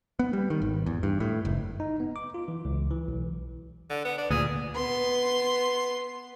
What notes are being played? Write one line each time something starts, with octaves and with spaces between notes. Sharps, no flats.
B3
G3
D#3
G#1
E2
G2
A2
F#1
D#4
B3
D6
F4
E3
C#2
E3
B1
D3
B3
D4
D2 A#2 G#4
B3 C6